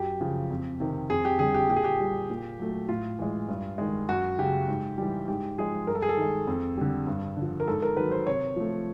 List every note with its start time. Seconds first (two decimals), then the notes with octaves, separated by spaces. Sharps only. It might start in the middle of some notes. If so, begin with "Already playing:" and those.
Already playing: F#2 G4
0.21 C#3 F3
0.51 F2
0.80 C3 D#3
1.10 F2 G#4
1.25 G4
1.39 D3 G3 G#4
1.54 G4
1.69 A#2 G4
1.76 G#4
1.84 G4
2.00 G3
2.30 A#2
2.59 F#3 A3
2.89 A2 F4
3.19 E3 G#3
3.48 G2
3.78 D#3 G#3
4.09 F#2 F#4
4.39 C#3 F#3 G4
4.68 G#2
4.98 E3 G3
5.28 G#2 G4
5.58 F3 G#3 G#4
5.87 G2 A#4
5.95 A4
6.02 G#4
6.09 A4
6.17 D#3 G#3
6.47 F2
6.77 D3 G3
7.07 G2
7.37 D3 F3
7.60 A#4
7.68 G#2 A4
7.83 A#4
7.97 D#3 F#3 B4
8.12 C5
8.27 C3 C#5
8.56 F3 A3